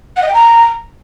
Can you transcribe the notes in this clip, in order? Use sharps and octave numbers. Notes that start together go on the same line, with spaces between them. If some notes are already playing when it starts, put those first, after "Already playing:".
F#5
D#5
G5
A#5